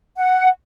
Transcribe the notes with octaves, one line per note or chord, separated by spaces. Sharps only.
F#5